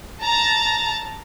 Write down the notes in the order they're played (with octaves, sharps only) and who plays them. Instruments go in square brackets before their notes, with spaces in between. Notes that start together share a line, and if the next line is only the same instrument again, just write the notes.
[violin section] A5 A#5 A6